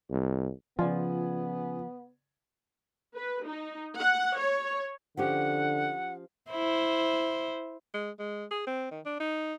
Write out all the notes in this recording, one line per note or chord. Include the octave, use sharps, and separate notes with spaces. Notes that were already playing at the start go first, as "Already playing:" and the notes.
C2
C#3 F3 B3 F4 D5 G#5
B4
D#4
F#5
C#5
D3 F3 C#4 G4 F#5
E4 C5
G#3
G#3
G#4
C4
D#3
D4
D#4